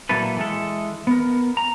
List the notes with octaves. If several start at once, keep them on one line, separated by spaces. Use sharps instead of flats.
A#2 F#3 A#3 E4 A4 B4
E3 G#3 A4
B3 A#4
A#5